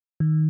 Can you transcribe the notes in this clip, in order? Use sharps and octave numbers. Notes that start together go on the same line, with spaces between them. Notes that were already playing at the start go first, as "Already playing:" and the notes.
D#3